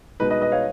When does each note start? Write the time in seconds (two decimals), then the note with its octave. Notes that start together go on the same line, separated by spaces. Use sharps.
0.20 B2 G#3 D#4 B4
0.30 B4 D#5
0.41 B4 D#5
0.52 C#5 F5